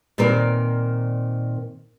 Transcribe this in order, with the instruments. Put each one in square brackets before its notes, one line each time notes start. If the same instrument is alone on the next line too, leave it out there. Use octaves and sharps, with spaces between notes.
[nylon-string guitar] A#2 D#3 C4 A#4 D5